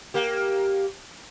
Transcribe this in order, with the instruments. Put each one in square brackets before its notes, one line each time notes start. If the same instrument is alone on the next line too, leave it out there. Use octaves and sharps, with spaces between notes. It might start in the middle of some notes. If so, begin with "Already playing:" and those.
[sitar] A#3 G4